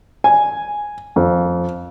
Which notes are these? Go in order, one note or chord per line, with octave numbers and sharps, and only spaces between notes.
G#5
F2